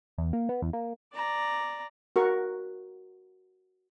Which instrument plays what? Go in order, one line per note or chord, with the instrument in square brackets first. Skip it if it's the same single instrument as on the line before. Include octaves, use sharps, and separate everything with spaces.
[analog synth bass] E2
A#3
B3
E2
A#3
[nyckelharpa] D5 A#5
[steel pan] F#4 A#4 C#6